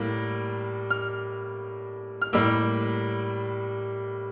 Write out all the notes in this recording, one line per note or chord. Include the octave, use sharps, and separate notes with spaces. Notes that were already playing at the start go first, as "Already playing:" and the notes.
Already playing: A2 G3 A#3
F6
F6
A2 G3 A#3 E6